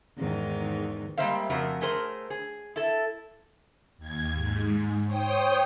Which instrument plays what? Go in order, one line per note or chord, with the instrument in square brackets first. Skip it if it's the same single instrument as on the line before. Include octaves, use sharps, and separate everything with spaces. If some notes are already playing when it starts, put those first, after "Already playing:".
[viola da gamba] E2 G#2 D#3
[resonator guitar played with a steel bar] G3 G#3 A#3 C5 E5 F5
F2 C#3 A3 F#4 A#4
A3 G#4 A#4 C5
G#4
E4 A4
[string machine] D#2 G#6
G#2
C5 C#5 G5 D#6